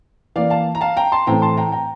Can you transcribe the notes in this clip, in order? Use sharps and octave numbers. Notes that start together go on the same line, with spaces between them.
E3 A#3 D5 F5
F5 A5
A#5
F5 A5
G5 A#5
A5 C6
A2 E3 A3 C4 G5 A#5
A5 C6
G5 A#5
G5 A#5